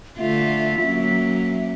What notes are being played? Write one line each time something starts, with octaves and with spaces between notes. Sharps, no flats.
D3 A3 F4 E5
F#3 A#3 C#4